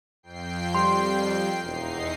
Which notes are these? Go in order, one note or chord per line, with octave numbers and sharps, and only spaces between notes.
F2 G5 C7
G3 C6
E1 E2 D#4 C7